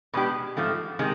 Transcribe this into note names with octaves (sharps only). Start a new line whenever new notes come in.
B2 G#3 B3 D4 G4
G#2 F3 A3 C4
C3 D#3 G#3